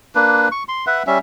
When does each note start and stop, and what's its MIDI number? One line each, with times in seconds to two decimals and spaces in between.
0.15 0.48 58
0.15 0.48 62
0.15 0.48 71
0.52 0.63 85
0.69 0.85 84
0.87 1.03 71
0.87 1.03 76
0.87 1.03 78
1.07 1.18 55
1.07 1.18 61
1.07 1.18 76